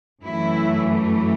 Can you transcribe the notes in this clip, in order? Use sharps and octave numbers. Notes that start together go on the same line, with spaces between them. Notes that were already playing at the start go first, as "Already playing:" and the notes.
F#2 E3 A3 E4